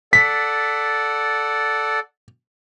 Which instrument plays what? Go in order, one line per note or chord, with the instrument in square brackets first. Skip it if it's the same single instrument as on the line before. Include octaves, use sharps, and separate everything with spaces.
[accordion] A4 D5 F#5 [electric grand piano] B6